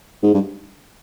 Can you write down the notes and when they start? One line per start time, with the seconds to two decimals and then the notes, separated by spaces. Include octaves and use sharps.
0.23 G#2
0.34 G2